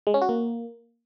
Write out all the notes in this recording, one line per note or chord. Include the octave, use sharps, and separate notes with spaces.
G#3
C#4
F#4
A#3